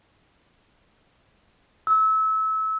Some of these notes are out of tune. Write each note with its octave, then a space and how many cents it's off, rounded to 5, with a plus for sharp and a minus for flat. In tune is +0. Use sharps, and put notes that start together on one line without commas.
E6 -25